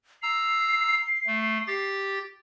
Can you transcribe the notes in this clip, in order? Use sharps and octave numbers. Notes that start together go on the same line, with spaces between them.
A#5 E6 C7
A3
G4 A6